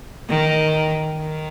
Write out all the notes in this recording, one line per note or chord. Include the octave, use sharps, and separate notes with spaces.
D#3
D#3